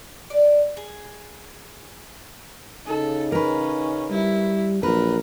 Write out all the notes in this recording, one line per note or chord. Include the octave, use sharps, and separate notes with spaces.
D5
G#4
C#3 D#4 A4
C#4 A#4 B4
G3 E4
A#1 F#3 A#4 B4